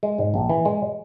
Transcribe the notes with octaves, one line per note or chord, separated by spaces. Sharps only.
G#3
G#2
A#1
E3
G#3